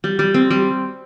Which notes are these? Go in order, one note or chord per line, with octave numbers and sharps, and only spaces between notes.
G3
G3
C4
G3